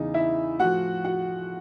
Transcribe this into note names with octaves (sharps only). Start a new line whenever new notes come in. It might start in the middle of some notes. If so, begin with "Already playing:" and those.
Already playing: E2 C#3 E3 D#4
E4 E5
A2 F3 F#4 F#5
F#4 F#5